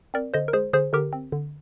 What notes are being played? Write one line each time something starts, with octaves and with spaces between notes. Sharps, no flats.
C4 A#4 D5
D3 C5 D#5
A#4
G#3 G#4 C5
D3 G#4 C5
D3 G4 A#4
C4
D3